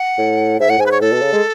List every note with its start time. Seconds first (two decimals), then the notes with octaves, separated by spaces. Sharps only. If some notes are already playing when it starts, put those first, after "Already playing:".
Already playing: F#5
0.18 A2
0.60 G#2 E5
0.69 A2 F#5
0.78 G#2 G#5
0.86 B4
0.91 C#5
1.01 A2 A4
1.12 B2
1.22 C#3
1.33 G#3